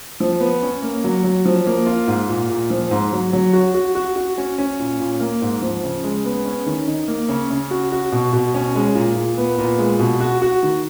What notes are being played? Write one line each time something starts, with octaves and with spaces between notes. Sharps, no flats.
F3
B3
C#4
A#3
F#3
F#3
F3
A#3
F4
G#2
A#2
A#2
F3
G#2
F#3
F#3
F#4
F#4
F#4
F#4
C#4
C#4
A#2
A#2
A#3
G#2
F3
C#3
G#3
B3
C#4
D#3
D#4
A#3
C#3
C#3
F#4
F#4
B2
B2
C#4
G#3
A#2
A#2
B3
A#2
G#3
B2
F#4
F#4
D#3